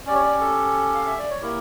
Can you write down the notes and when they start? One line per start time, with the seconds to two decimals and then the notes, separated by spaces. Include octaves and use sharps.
0.06 C#4 D5
0.10 G4 C#5
0.21 D5
0.41 A4
0.95 F5
1.07 E5
1.18 D5
1.30 C#5
1.42 A#3 E4 G4 A#4